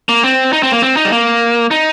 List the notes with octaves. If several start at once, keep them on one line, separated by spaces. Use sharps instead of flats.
A#3
C4
D#4
C4
A#3
C4
D#4
G3
A#3
D#4